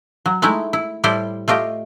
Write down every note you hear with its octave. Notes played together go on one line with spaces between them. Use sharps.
F#3
G#3 A3 D#4 E4
E4
A2 G3 E4 G4 A4 C5
A3 F4 G4 D#5